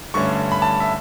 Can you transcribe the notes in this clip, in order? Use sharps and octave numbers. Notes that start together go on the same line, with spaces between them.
G2 D3 A3 C#4 C#6
B5
A5
E5